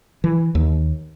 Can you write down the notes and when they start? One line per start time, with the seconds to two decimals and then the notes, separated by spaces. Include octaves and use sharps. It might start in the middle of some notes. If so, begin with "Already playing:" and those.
0.24 E3
0.55 D#2